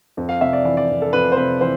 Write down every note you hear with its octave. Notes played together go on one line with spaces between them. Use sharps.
F2
F5
C3 E5
D5
E3 D5
D5
F2
A4
F2 B4
C5
C3 B4
E3 C5